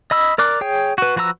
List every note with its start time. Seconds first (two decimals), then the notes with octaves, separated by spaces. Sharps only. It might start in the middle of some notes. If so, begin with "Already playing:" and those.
0.11 D#5 B5 E6
0.38 A#4 D5 D6 F#6
0.61 G#4 C#5 G5
0.98 F#4 B4
1.16 F3 F#4 B4 A#5 E6